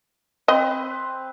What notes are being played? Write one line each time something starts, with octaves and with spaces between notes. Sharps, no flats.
C4 B4 D#5